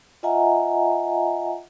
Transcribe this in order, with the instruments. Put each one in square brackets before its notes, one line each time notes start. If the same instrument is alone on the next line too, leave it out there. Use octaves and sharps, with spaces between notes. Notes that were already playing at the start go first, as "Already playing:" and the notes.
[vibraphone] F4 D#5 E5 F#5 G#5 A#5